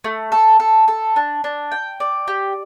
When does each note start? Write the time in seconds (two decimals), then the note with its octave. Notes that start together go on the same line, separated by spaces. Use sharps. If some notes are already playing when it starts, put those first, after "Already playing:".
0.04 A3
0.32 A4
0.60 A4
0.88 A4
1.16 D4
1.44 D4
1.72 G5
2.00 D5
2.28 G4